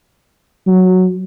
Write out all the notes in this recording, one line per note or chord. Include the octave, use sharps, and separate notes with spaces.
F#3